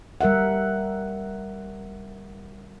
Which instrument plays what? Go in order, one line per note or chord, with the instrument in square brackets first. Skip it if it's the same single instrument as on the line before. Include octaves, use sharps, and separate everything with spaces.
[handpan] G3 A#4 E5 F#5